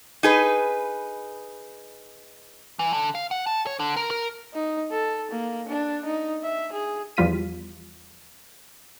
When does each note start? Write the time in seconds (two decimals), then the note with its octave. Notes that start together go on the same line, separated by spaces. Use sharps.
0.23 D#4 G#4 B4
2.79 E3
2.93 D3
3.15 F5
3.31 F#5
3.47 A5
3.67 C#5
3.80 D3
3.96 A#4
4.11 A#4
4.54 D#4
4.91 A4
5.31 A#3
5.69 D4
6.05 D#4
6.43 E5
6.73 G#4
7.17 E2 F3 G3 F4 B6 D#7